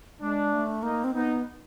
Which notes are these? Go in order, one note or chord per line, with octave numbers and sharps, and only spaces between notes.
G#3 D4
A3
A#3 D#4
C4
B3 D#4